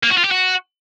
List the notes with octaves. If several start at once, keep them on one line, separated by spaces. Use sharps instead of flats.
A#3
F#4
F4
G4
F#4